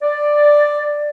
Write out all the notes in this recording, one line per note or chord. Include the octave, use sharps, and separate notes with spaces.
D5